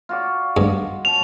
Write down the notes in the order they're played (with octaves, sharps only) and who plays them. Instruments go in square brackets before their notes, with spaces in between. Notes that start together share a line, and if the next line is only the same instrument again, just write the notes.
[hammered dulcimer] F4 F#4 D5
[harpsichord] G2 [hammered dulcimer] D#5
[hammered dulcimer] C#4 A5 [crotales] F7